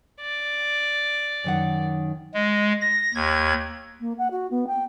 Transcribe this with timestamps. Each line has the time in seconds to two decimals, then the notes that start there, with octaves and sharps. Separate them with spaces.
0.21 D5
1.44 F#2 D#3 F#5
2.34 G#3
2.81 A#6
3.14 D#2 G#6
4.00 A#3
4.18 F#5
4.31 F#4
4.51 B3
4.67 G5